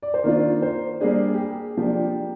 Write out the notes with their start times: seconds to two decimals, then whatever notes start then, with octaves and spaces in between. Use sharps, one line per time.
0.03 D5
0.14 C5
0.24 D#3 A#3 D4 F4 A#4
0.62 C5
1.00 G3 A#3 D4 G#4
1.34 G4
1.40 G#4
1.77 F3 A#3 D4 G4